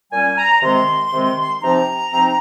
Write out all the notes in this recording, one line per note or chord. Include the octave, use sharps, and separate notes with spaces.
A#2 G3 C#4 G#5
A#5
C3 D#3 G#3 C4 C6
C3 D#3 G#3 C4
C3 F3 C4 D#4 A#5
C3 F3 C4 D#4